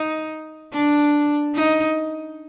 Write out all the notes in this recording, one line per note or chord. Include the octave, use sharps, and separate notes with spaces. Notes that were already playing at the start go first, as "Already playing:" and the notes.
Already playing: D#4
D4
D#4